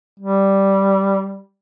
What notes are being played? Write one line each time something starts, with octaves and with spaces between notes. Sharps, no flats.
G3